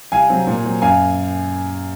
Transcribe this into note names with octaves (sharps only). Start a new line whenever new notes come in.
C2 F5 G#5
C3 F#3 C4
A#2
F#3 C4
F#2 F5 G#5